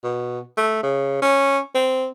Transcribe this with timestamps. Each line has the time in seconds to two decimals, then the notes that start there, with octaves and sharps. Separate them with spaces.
0.03 B2
0.57 A3
0.83 C#3
1.22 C#4
1.75 C4